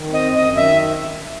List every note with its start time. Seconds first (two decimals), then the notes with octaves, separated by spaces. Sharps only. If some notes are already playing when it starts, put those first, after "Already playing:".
Already playing: D#3
0.09 C4 D#5
0.24 F#2
0.35 F#2 D#5
0.56 D#3 E5